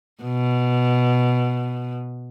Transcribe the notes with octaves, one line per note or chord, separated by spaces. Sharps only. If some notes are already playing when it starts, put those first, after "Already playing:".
B2